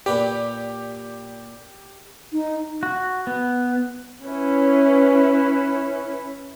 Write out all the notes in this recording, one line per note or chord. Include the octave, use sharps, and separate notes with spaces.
A#2 G4 B4 D5
D#4
F#4
B3
C#4 E4 B4